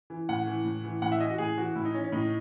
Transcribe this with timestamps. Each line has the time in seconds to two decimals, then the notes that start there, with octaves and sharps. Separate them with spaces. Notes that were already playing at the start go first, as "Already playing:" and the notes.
0.10 E3
0.29 A2 F#5
0.47 E3
0.65 A2
0.84 E3
1.02 A2 F#5
1.12 E5
1.20 E3 D#5
1.30 F#4
1.38 A2 G#4
1.58 E3 F#4
1.75 A2 E4
1.85 D#4
1.94 E3 C#4
2.04 C#4
2.12 A2 D#4